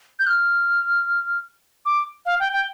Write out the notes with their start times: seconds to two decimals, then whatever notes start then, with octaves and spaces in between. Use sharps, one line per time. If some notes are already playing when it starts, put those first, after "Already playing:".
0.19 G6
0.27 F6
1.86 D6
2.26 F5
2.40 G5
2.53 G5